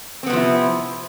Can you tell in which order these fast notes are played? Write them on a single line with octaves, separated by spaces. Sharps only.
C4 B3 C3 F3 E4